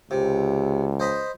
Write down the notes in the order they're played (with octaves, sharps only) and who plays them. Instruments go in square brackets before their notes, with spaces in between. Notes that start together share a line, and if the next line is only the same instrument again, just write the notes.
[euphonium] C#2 [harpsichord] C3
[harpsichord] C5 D#5 B5